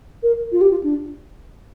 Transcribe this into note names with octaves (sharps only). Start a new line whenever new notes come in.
A#4
F4
G4
F4
D4